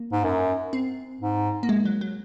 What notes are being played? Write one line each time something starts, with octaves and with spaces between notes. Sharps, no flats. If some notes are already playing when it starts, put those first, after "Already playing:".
Already playing: A#3
G#2
F#2
C4
G#2
A#3
G#3
F#3
F#3